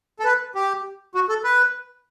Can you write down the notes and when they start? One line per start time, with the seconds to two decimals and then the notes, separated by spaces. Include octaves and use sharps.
0.20 A4
0.24 B4
0.55 G4
1.15 F#4
1.29 A4
1.44 B4